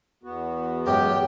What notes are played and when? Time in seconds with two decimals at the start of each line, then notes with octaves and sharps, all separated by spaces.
0.23 E2 B3 F#4
0.86 F#2 G#3 G4 G5